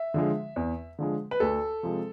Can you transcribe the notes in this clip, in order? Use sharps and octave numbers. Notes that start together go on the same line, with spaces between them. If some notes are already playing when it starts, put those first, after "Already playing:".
Already playing: E5
D3 F3 G#3
E2
D3 F3 G#3
B4
D2 A4
C3 F3 G#3